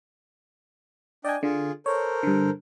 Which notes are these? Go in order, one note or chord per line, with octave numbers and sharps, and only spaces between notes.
D4 D5 D#5 G5 G#5
D3 F4 G#4
A4 A#4 C5 C#5
G2 D3